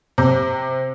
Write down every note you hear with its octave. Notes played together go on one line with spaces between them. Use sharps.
C3